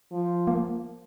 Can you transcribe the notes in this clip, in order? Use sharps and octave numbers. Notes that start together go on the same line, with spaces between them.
F3
A#3